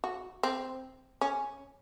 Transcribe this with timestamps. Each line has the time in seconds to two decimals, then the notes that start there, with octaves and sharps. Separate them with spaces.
0.04 F#4
0.43 C4
1.21 C#4